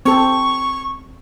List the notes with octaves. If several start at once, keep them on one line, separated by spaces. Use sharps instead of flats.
C4 A4 C#6